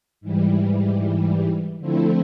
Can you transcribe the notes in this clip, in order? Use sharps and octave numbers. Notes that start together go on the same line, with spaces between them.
G#2 E3 G3
D3 F3 A3 C4 E4